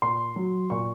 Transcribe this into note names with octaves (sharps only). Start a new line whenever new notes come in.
A#2 C6
F#3
A#2 C#6